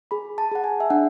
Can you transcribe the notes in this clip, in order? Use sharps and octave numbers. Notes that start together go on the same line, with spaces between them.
G#4 B5
A5
G#4 F#5
G#5
E5
D4 F#5